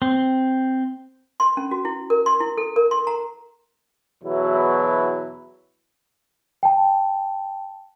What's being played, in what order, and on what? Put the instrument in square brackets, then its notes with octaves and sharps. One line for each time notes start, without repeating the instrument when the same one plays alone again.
[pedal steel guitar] C4
[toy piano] C6
C#4
F#4
E4
A#4
C6
E4
A4
A#4
C6
A#5
[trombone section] E2 B2 E3 F#3 E4
[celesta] G5 A5